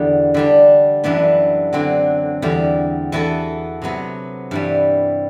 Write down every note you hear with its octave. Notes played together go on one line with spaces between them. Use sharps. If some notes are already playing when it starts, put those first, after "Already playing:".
Already playing: E2 D3 G3
D3 G3 D4
F#2 E3 G3 B3 D4
D3 F#3 C4
E2 D3 G3
E3 B3 F#4 A4
C3 F#3 B3
G2 E3 G3